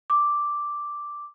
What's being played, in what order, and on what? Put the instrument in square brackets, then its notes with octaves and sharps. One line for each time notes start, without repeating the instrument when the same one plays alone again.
[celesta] D6